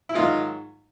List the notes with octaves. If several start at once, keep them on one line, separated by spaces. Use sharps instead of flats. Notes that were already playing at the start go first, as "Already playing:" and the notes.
E4
G#2 D#3 F#3 D#4 F4